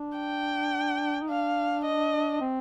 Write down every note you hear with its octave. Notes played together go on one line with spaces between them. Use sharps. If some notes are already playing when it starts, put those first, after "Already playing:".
Already playing: D4
G5
D#4
D4 F5
D#5
C4